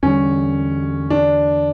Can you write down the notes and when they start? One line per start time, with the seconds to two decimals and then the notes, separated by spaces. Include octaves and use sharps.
0.03 E2 D3 G3 C#4
1.10 D4